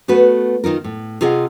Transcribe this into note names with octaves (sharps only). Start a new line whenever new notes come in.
A3 B3 F#4 B4
D#3 D#4 F4 A#4
A2
C3 F4 G#4 D#5 F#5